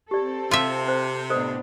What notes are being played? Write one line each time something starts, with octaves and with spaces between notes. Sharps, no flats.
C4 G4 A4 D5
C3 F4 E5
C5
A2 B3 D4 A4 C5 D#5